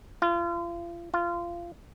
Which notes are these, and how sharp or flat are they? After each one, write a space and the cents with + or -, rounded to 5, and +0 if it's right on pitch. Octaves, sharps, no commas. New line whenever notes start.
F4 -35
F4 -20